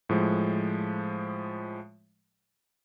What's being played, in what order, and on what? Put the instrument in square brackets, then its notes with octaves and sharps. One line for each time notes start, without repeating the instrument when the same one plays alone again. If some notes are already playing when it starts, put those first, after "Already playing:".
[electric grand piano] A2 F3 G#3